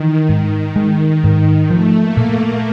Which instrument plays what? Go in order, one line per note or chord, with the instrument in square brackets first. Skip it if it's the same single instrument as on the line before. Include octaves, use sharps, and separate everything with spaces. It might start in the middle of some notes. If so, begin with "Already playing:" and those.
Already playing: [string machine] D#3 [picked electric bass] E3
[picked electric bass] G#2
G#3
G#2
[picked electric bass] F3 [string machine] A3
[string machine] A#3
[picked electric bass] A#2
[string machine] A3